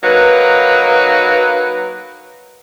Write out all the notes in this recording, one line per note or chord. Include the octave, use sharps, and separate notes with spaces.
F#3 A#3 D#4 B4